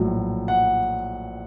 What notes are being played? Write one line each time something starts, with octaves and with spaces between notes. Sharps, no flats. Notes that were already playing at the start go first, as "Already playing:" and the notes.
Already playing: A#1 A2 F#3
F#5